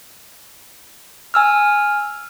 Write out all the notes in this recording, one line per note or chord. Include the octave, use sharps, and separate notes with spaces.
G#5 E6 F6